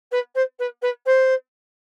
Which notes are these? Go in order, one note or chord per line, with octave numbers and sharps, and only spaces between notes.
B4
C5
B4
B4
C5